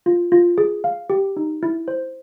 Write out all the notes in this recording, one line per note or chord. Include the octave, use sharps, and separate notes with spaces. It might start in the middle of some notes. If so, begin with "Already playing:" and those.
F4
F4
G#4
F5
G4
D#4
E4
C5